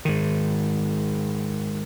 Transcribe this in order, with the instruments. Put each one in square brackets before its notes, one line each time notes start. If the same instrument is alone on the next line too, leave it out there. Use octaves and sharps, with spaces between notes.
[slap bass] G#2 D#3